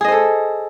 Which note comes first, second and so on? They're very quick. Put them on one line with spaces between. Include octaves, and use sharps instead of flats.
G#4 D#5 C5 A4